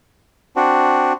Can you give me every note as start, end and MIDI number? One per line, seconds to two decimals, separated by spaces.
0.56 1.13 60
0.56 1.13 62
0.56 1.13 66